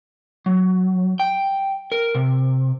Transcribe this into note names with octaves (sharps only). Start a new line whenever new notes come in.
F#3
G5
A#4
C3